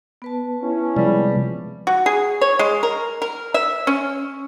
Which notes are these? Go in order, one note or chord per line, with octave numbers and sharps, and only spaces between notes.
B3 B4 A5
C#4 E4
C3 F3 G3 G#3
F#4
G#4
C#5
G#3
A#4
A#4
E5
C#4